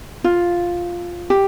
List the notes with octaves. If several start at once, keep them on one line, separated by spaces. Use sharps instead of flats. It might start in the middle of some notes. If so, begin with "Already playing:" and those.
F4
G4